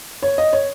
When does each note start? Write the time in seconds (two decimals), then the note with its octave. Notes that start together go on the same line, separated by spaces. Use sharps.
0.23 C#5
0.38 D#5
0.53 C#5